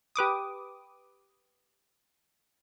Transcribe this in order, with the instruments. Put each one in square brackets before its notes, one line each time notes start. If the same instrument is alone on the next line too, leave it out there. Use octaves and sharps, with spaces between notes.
[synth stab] G4 B4 D6 D#6